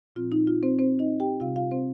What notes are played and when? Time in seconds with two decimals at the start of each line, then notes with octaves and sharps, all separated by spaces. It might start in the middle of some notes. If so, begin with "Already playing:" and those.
0.16 A#2 F3 C4 F4
0.32 D#4
0.47 F4
0.62 C4 C5
0.79 C4 C5
0.99 D#4 D#5
1.20 G4 G5
1.40 C3 G3 C4 F4 F5
1.56 F4 F5
1.71 C4 C5